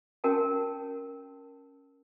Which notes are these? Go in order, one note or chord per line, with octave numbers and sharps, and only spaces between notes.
C#4 F#4 A#4 G5 A5